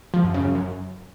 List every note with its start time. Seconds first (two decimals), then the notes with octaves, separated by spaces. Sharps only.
0.14 F3
0.24 F#2
0.34 C#3
0.45 F#2
0.55 F#2